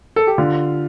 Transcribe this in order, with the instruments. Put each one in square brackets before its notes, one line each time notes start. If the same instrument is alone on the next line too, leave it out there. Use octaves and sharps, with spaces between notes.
[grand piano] A4
G4
[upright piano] D3 [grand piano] F4